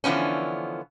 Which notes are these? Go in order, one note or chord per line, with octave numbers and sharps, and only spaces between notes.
D3 E3 F3 B3 C#4